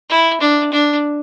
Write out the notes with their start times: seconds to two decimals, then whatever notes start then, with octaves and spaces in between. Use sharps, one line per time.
0.10 E4
0.40 D4
0.72 D4